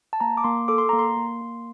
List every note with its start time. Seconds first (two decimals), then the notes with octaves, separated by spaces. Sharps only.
0.13 A5
0.20 A#3 A#5
0.37 D6
0.44 A#3 C6
0.68 A4 D6
0.78 C6
0.89 A#3 A#5
0.99 C6
1.17 A#3
1.41 A#3